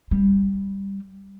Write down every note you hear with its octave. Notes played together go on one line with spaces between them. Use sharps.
G3